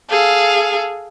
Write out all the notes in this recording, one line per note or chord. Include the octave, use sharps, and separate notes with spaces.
G#4 A4 F5